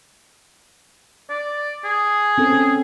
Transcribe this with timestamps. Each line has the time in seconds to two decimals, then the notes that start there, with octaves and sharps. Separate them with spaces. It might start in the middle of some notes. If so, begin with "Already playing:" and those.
1.30 D5
1.85 G#4
2.38 C4 C#4 A4